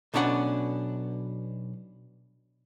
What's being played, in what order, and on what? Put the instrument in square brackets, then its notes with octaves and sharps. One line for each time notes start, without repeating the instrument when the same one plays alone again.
[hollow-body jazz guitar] B1 B2 C#4 D4 F4 F#5